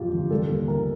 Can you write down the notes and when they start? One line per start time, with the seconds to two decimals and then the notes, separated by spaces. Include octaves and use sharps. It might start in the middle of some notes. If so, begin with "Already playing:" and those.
Already playing: F2 C3 F3 F4 G4
0.12 G1
0.31 G3 A4
0.49 D#2
0.68 D#3 A#4